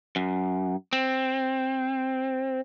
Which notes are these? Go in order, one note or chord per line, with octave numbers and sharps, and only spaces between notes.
F#2
C4